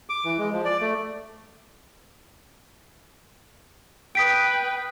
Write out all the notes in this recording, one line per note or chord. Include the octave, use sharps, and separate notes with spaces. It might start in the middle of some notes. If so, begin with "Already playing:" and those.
D6
E3
G#3
F3
D5
A3
B4 G5 D#6 B6 D7